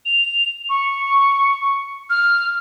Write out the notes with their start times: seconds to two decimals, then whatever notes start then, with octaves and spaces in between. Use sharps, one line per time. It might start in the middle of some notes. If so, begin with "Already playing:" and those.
0.06 F7
0.69 C#6
2.10 F6